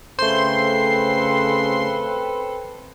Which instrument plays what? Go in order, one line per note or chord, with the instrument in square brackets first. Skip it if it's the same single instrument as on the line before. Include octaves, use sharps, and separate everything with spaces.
[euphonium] C#3 [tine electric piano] A3 C5 [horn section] C4 A4 B4 [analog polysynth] C6